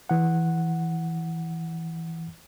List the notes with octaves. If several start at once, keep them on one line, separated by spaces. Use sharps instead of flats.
E3 F#5